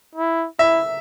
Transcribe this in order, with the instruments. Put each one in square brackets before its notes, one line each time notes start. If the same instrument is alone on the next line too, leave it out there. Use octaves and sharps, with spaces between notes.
[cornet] E4
[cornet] E4 [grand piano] E5